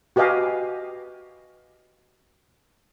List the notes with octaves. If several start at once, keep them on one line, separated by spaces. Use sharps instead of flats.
F#4 G4 B4 D#5 F5 G#5